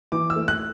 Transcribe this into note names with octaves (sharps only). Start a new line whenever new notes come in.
E3 D6
E6
A3
F#6